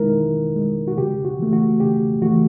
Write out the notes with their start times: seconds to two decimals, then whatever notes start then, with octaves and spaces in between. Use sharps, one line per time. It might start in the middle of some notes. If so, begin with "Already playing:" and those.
Already playing: D#3 G#3 D#4 E4 A#4
0.15 D#3
0.56 G#3
0.88 F#4
0.98 C#3 G4
1.25 F#4
1.39 E3 A3
1.53 F#4
1.80 C#3 G4
2.22 E3 A3 F#4